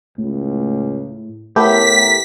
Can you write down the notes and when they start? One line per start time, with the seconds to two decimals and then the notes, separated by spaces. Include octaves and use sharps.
0.18 C#2 A2
1.56 A2 A3 B3 G4 A#4 B6